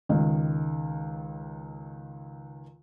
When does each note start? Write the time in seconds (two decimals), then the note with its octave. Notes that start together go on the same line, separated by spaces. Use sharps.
0.09 C#2 D#3